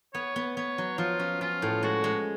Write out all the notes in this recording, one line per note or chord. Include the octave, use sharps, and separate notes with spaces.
B3 C#5
B3
B3 C#5
F#3
F3 F4
C#4
C#4 F4
A2
G#3 F#4
G#3